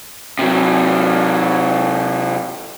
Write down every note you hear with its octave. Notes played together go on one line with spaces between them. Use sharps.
C3 F#3